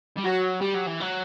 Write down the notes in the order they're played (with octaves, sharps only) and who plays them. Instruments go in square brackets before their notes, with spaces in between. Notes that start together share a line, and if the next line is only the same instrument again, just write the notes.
[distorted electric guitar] G3
[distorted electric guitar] F#3 [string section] F#4
[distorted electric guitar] G3 [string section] G4
[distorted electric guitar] F#3
E3
F#3